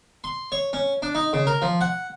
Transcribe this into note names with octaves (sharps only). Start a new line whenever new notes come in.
C6
C#5
C#4
D4
D#4
C#3
A#4
F3
F#5